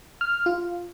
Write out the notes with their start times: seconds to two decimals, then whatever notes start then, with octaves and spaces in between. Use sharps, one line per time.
0.21 F6
0.46 F4